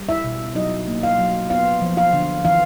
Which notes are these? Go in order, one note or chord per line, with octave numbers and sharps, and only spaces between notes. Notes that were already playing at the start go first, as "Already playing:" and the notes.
Already playing: G3
E4 E5
B2
F#3 D#4 D#5
A#3
F4 F5
F#3
B3 F4 F5
F3
F4 F5
D3
E3 F4 F5